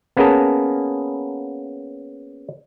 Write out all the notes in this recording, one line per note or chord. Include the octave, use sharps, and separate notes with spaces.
A#3 B3 C#4 G#4 A#4 A5